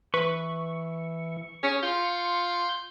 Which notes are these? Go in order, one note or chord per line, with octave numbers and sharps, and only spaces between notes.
E3 B4 C#6
C#4 G#4
F4 C6 G6